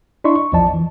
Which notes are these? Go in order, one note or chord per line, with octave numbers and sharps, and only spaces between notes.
D4 E4 D5 D#5 C6 C#6
C#6
A#1 E2 F3 D5 D#5 A5
E3